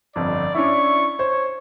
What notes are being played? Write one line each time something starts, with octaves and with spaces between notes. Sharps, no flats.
G1 F2 D5
C#4 D4 E4 C#6
C5 C#5